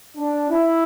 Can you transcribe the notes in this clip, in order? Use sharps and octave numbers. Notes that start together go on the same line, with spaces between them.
D4
E4